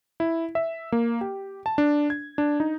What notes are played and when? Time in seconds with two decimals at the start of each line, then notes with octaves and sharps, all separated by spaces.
0.20 E4
0.55 E5
0.92 A#3
1.21 G4
1.66 A5
1.78 D4
2.10 G#6
2.38 D4
2.60 D#4